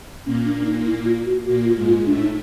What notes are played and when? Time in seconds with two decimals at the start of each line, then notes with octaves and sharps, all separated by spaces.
0.25 A#2 A#3 C#4
0.45 D4
0.61 D4
0.65 D#4
0.86 E4
1.05 F4
1.26 F#4
1.46 A#2 A#3 F#4
1.65 F4
1.75 G#2 G#3
1.86 F4
2.06 A2 A3 D4
2.21 D#4